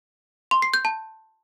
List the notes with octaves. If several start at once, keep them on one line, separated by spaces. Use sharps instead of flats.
C6
C7
G6
A5